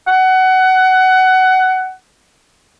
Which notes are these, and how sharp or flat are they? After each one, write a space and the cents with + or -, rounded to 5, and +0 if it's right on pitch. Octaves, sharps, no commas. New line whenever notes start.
F#5 +20